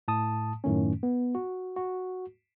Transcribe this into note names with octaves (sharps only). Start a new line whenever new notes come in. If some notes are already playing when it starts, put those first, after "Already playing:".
A2 A5 D#6
F#2 A2 D#3 A3 C#4
B3
F#4
F#4